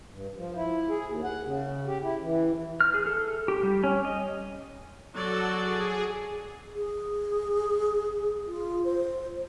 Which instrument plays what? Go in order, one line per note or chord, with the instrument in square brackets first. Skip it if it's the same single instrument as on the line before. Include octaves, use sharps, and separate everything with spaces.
[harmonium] G2
F3
E4
G#4
D#2
F#5
C#3
G4
E4
E3
[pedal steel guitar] F6
G#4
A4
G4
G3
C#4
D#5
[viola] F#3 D5 [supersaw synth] F#4 A4
[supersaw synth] G#4
[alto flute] G#4
F4
C5